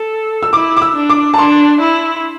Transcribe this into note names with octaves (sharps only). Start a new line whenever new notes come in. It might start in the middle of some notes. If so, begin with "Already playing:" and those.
Already playing: A4
E6
E4 D6
D6
E6
D4
D6
A5
D4 C6
E4